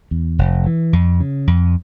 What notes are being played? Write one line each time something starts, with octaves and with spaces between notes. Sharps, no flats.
E2
F1
E3
F2
C#3
F2